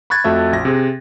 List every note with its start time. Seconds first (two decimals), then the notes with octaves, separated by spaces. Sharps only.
0.10 B5 C#6 F#6 G#6 A6
0.24 F2 A3 F#4 E5
0.52 A#1 A#6
0.65 C3 G#4